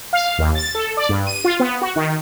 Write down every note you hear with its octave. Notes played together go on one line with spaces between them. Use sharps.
F5
D#2
A6
A4
D5
G2
D#7
F4
B3
F#4
D#3